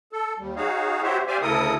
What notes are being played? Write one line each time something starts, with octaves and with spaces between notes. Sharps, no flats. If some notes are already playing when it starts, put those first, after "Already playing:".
A4
D#2 G3
D#4 F#4 G#4 C#5 F5
E4 F#4 G4 C5 C#5 E5
G4 C5 D5 E5 F5 G#5
D2 C#3 E4 A4 A#4 D#6